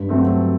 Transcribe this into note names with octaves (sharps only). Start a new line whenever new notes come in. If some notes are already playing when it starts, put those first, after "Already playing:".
Already playing: G2
F#3 A3 C4